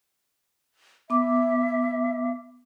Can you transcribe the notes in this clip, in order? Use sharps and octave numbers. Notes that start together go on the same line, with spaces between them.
B3 E5 D6